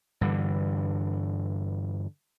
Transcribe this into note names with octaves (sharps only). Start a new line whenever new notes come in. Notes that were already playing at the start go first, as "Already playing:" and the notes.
G2 D3 E3